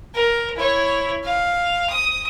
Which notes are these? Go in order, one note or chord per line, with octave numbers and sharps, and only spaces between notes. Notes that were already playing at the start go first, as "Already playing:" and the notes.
A#4
E4 C#5
F5
D#6